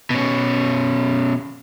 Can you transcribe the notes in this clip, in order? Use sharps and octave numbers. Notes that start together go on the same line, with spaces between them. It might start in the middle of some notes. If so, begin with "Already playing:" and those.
B2 C#4